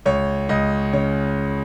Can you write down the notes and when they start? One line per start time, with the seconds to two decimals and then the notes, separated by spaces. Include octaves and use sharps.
0.06 C#2 C#5
0.49 C#2 D#5
0.93 C#3 C#5